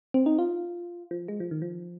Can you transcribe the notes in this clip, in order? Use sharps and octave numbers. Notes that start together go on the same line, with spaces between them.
C4
D#4
F4
F3
G#3
F3
D#3
F3